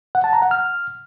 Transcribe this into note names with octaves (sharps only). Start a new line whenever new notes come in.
F#5
A5
A#5
F#5
F6